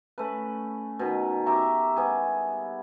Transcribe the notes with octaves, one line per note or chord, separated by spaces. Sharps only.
A3 C#4 B4
B2 D#3
G4 E5 A#5 C#6
G3 B3 G#4